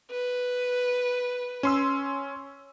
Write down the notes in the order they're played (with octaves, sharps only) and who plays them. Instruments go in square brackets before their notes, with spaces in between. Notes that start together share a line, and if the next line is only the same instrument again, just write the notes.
[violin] B4
[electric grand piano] C#4 C6 E6